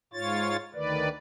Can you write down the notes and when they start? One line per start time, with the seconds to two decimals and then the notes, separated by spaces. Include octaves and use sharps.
0.13 G#2 F4 C#5 A6
0.74 D2 D#3 B4 D5